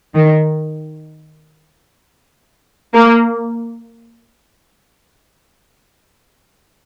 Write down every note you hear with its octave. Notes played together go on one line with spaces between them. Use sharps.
D#3
A#3